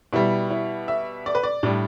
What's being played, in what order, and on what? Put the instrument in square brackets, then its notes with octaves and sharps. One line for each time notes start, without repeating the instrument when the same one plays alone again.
[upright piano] B2 G3 E4
E4
E5
D5
B4
D5
A2 G3 D4